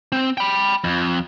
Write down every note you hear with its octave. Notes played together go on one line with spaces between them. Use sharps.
C4
G5 B5
F2